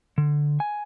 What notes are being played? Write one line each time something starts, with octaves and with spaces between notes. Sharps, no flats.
D3
G#5